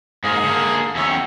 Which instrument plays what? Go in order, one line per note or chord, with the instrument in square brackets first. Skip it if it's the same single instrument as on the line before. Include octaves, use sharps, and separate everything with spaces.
[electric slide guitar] G#2 A#3 [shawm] G#4
[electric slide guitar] D3 A#3
[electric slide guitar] E2 F#3 C#4 [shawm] E5
[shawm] G5